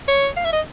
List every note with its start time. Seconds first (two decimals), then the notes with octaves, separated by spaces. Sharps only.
0.08 C#5
0.37 F5
0.44 E5
0.53 D#5